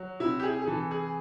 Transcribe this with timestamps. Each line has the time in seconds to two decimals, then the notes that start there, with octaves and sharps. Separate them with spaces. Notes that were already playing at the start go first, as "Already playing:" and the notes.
Already playing: F#3
0.20 C3 E4
0.40 G4
0.43 G#4
0.62 G#4
0.67 E3 A4
0.91 G#4